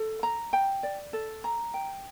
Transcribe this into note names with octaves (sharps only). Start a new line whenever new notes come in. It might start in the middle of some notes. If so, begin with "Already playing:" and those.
Already playing: A4
A#5
G5
D5
A4
A#5
G5